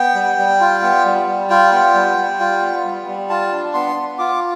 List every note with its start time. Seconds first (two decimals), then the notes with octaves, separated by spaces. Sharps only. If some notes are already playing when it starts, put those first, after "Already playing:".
Already playing: B3 G5
0.15 G3
0.38 G3
0.60 F4
0.82 B3
1.05 G3
1.27 G3
1.50 F4 G5
1.72 B3
1.95 G3
2.17 G3
2.40 F4
2.62 B3
2.84 G3
3.07 G3
3.29 F4 A5
3.52 D4
3.74 B3 C6
3.96 B3
4.18 F4 D6